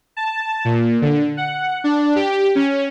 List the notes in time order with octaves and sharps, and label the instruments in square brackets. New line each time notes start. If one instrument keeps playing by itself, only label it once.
[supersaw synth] A5
A#2
D3
F#5
D4
G4
C#4